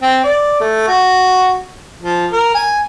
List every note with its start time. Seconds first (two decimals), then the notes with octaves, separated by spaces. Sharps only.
0.02 C4
0.23 D5
0.60 A3
0.88 F#4
2.02 F3
2.32 A#4
2.55 G#5